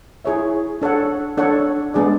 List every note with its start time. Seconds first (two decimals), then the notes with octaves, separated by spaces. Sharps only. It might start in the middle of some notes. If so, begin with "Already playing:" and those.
0.25 E4 G#4 C#5 E5
0.82 D4 A4 C#5 F#5
1.38 D4 A4 C#5 F#5
1.94 G#3 B3 D4 G#4 D5